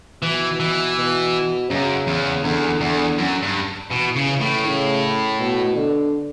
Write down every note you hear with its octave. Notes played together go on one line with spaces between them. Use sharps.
B2 E3
E3
B2
F#2 C#3
E2
E2 D3
E2 D3
F#2
G2
B2 E3
C#3
E3
A2
C#3
B2
D3